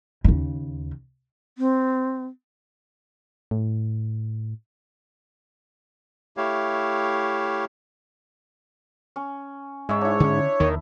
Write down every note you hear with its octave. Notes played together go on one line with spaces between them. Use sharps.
D#2 C#3
C4
A2
A3 E4 G4 C#5 F5
C#4
G#2 C#5 E5
D4 E4 C#5
D3 C#4
D#2 D#3